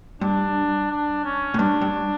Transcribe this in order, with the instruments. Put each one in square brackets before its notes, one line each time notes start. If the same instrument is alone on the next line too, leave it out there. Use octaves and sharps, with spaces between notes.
[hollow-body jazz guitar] G2 [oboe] D4
[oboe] D4
C#4
[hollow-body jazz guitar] A2
[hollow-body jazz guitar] G2 [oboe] D4
[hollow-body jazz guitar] G2